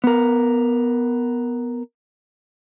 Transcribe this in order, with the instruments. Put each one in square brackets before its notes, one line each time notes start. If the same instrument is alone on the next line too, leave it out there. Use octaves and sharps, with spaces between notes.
[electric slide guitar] B3 A#4